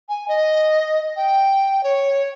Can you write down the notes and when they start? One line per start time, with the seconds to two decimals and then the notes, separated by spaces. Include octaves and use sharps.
0.09 G#5
0.28 D#5
1.16 G5
1.84 C#5